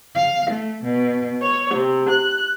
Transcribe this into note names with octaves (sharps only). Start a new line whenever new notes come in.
F5
A3
B2
C#5
C3
F#6